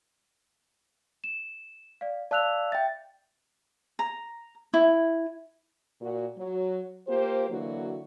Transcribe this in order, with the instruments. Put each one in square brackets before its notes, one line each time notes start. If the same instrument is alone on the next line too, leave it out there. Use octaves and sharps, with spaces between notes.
[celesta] E7
D5 F5
[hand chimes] D5 F5 E6 [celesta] A5 F#6 F7
[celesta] E5 [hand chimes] G5 A6
[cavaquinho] A#5
E4
[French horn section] A#2 F#4
F#3
A#3 F4 G4 C5
D3 E3 F#3 A#3 F#4